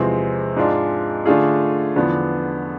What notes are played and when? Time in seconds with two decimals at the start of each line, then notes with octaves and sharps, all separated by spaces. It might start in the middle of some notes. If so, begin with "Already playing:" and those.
Already playing: E2 C3 F3 G#3 C4
0.56 G#2 G#3 D4 F4
1.25 D3 A3 D4 F4 G#4
1.95 E2 D3 F3 B3 D4